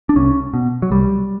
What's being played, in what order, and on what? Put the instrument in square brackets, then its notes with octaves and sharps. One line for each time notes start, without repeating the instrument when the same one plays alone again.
[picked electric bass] D4
C2 C#4
B2
F#3
C2 G3